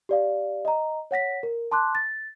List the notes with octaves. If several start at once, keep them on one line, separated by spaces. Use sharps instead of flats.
G4 D5 F5
D#5 A#5
C#5 F#5 A#6 B6
A#4
A5 C6 D6 F#6
A6